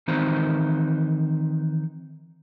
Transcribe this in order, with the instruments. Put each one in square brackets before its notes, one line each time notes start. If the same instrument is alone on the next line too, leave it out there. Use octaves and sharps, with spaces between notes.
[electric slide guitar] D#3 E3 C4 D#4 B4 C5